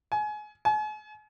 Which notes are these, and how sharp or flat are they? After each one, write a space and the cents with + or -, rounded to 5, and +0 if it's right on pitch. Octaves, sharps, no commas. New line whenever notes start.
G#5 +25
G#5 +40